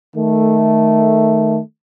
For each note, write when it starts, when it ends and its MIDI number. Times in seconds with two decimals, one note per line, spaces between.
0.16 1.60 51
0.16 1.60 57